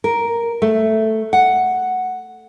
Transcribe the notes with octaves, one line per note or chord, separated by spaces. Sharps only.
A#4
A3
F#5